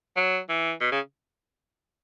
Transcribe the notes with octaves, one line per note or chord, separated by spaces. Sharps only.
F#3
E3
B2
C#3